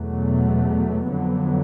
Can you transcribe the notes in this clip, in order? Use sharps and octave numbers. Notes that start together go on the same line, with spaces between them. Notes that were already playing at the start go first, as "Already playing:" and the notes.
Already playing: E2 B2 F#3 A3
F2 D3 F#3 B3